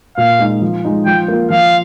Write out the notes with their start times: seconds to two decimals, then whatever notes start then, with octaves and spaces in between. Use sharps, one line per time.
0.17 A#2 F5
0.39 G#3 D#4
0.62 F3
0.85 G#3 D#4
1.06 F3 G5
1.28 A#3 F4
1.50 F3 F5